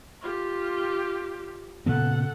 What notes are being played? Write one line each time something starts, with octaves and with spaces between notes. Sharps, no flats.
F4 G4
A#2 C#3 B3 A4 F#5